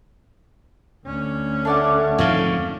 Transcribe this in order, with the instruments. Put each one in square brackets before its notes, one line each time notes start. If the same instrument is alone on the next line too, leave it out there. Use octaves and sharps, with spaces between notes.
[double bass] D2 C#4
[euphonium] A3 [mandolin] D4 D5 F#5
[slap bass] F2 G#2 D#3 [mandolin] C#5 F5